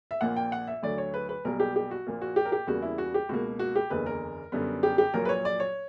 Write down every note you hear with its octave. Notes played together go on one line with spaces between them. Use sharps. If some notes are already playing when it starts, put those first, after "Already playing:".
E5
A#1 A#2 A#3 F#5
G5
F#5
E5
D2 D3 F#3 D5
C#5
B4
B4
B1 B2 G3 A#3 A#4
G4
G4
F#4
A#1 A#2 A#3
F#4
G4
A#4
G4
E2 C#3 G3 A#3 F#4
E4
F#4
G4
C#2 B2 A#3 F#4
F#4
G4
F#1 E2 D3 A#3 B4
A#4
F#2 D3 G3 B3
G4
G4
A#1 A#2 F#3 A#3 A#4
B4
C#5
D5
C#5